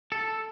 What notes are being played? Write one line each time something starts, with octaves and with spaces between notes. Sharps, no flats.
A4